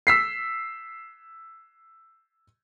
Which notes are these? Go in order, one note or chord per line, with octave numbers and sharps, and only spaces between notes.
E6 B6 C7